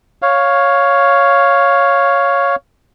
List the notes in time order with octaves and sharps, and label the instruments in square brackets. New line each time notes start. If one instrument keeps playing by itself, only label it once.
[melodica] C#5 F5